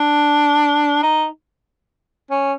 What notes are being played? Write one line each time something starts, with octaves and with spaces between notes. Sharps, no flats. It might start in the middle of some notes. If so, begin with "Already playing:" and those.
Already playing: D4
D#4
C#4